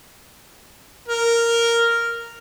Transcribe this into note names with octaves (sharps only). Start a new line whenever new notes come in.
A#4